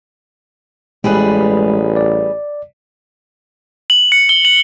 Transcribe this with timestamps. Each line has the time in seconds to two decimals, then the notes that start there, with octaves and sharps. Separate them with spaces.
1.04 A1 G3 G#3 G#4 B4
1.96 D5
3.90 F#7
4.12 C#7
4.29 G7
4.45 F#7